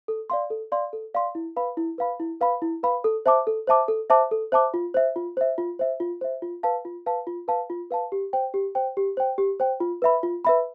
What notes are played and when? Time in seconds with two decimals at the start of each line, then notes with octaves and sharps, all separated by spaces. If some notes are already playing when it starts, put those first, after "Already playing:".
0.08 A4
0.30 D5 F5 C6
0.50 A4
0.72 D5 F5 C6
0.93 A4
1.14 D5 F5 C6
1.35 E4
1.56 B4 F5 B5
1.77 E4
1.98 B4 F5 B5
2.20 E4
2.41 B4 F5 B5
2.62 E4
2.83 B4 F5 B5
3.04 A4
3.26 C5 E5 A5 D6
3.47 A4
3.67 C5 E5 A5 D6
3.88 A4
4.10 C5 E5 A5 D6
4.31 A4
4.52 C5 E5 A5 D6
4.74 F4
4.94 C5 E5
5.16 F4
5.37 C5 E5
5.58 F4
5.79 C5 E5
6.00 F4
6.21 C5 E5
6.42 F4
6.63 B4 F5 A5
6.85 F4
7.06 B4 F5 A5
7.27 F4
7.48 B4 F5 A5
7.70 F4
7.91 B4 F5 A5
8.12 G4
8.33 C5 G5
8.54 G4
8.75 C5 G5
8.97 G4
9.17 C5 G5
9.38 G4
9.60 C5 G5
9.80 F4
10.02 B4 E5 B5
10.23 F4
10.45 B4 E5 B5